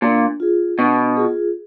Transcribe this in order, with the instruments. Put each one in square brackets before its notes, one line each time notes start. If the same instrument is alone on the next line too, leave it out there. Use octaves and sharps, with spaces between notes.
[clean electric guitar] A#2 [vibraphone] D4
[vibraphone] F4 G#4
[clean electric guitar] B2 [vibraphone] D4
[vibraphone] F4 G#4